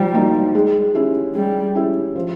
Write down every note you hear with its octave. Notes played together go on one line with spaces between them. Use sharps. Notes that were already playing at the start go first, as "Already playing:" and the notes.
Already playing: F3 G3 D#4
A#3 D#4 F#4
G#3
C#4 E4 G4
G3 G#3
C#4 E4 G4
F3